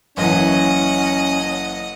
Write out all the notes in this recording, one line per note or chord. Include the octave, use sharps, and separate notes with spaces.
F#1 E3 C#4 D#5 F#5